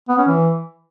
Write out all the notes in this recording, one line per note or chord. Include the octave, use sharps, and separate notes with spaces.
B3
C#4
E3